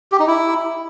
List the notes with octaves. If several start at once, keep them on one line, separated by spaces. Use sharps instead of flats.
G4
D#4
E4